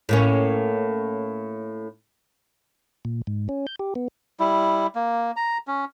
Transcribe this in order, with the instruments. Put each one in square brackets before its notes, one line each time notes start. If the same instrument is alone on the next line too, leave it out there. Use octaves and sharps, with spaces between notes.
[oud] A2 A#3 C#4
[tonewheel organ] A#2
G#2
C#4
G6
G4
B3
[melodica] G3 E4
A#3
A#5
C#4